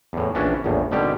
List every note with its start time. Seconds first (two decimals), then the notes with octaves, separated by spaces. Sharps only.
0.13 E2 A2
0.35 A#1 E3 C#4 D4
0.64 A#1 E2 A2
0.91 G#1 B2 D3 G3 G4